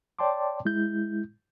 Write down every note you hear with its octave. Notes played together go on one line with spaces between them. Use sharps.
C#5 D5 G5 A5 C6 D6
G#3 E4 G6